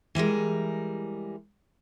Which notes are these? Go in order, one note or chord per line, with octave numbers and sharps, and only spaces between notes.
E3 G3 G#3 A#4